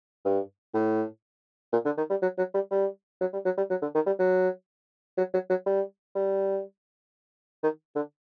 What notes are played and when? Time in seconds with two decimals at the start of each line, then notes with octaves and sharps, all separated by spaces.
0.25 G2
0.74 A2
1.73 A#2
1.85 D3
1.97 D#3
2.10 G3
2.22 F#3
2.38 F#3
2.54 G3
2.71 G3
3.21 F#3
3.33 G3
3.45 F#3
3.57 G3
3.70 F#3
3.82 D3
3.95 D#3
4.06 G3
4.19 F#3
5.18 F#3
5.34 F#3
5.50 F#3
5.66 G3
6.15 G3
7.63 D#3
7.96 D3